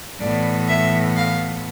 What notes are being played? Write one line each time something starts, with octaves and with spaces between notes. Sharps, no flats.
A2 E3 B3 D5
E5
F5